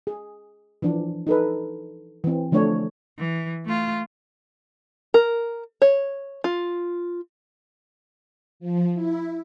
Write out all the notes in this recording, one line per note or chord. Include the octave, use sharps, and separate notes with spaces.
G#4
E3 F3 D4
D#4 A4 B4
E3 C4
D3 F3 A3 D4 C#5
E3
A3 F4
A#4
C#5
F4
F3
E4